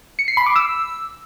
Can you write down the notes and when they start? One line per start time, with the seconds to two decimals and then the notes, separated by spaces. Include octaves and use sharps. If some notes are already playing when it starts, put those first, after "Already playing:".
0.19 C#7
0.28 C7
0.37 B5
0.46 D6
0.56 E6